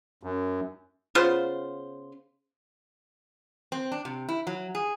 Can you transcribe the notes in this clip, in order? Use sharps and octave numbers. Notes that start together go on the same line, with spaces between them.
F#2
C#3 B3 F4 C5
C4
D4
C3
E4
F#3
G#4